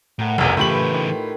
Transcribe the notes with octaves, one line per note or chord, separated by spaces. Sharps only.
A2 A4 A#4 F#5
F1 B1 F#2 G#4
A2 C#3 E3 F4 G4 B4 F#7
D#3